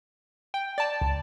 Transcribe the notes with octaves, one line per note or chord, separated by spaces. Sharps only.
G5
D5 A5
C#2